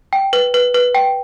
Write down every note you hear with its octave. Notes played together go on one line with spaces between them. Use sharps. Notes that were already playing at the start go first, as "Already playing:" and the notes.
G5
B4
B4
B4
G5